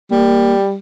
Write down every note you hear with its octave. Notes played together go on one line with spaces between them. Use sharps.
G3 A#3